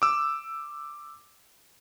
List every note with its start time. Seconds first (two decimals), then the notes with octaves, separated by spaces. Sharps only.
0.02 D6 E6